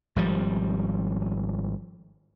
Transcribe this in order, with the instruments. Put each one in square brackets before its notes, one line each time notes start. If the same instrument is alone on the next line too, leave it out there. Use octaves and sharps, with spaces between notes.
[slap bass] G#1 F3 G3